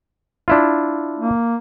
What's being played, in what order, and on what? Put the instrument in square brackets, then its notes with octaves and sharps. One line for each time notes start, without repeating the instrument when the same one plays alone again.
[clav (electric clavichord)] D4 E4 F4
[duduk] A#3